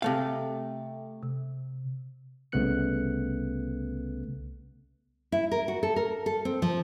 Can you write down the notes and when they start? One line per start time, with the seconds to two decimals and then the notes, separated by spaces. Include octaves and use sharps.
0.02 C3 A3 F5
1.23 C3
2.52 C2 C#3 A3 B3 F#6 C#7
5.32 E4
5.51 A#4
5.68 F#4
5.83 A4
5.96 A#4
6.26 A4
6.45 C4
6.62 F3